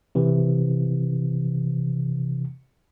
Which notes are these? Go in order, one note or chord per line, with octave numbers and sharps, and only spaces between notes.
C3 E3